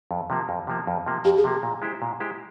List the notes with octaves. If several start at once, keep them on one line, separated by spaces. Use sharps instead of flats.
F2
C3 F3 A#3
F2
C3 F3 A#3
F2
C3 F3 A#3
F2 G4
G#4
C3 F3 A#3
A#2
G#3 E4 G4 C5
A#2
G#3 E4 G4 C5